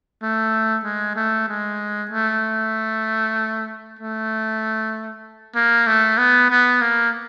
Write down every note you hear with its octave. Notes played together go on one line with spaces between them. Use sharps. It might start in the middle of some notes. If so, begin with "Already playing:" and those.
A3
G#3
A3
G#3
A3
A3
A#3
A3
B3
B3
A#3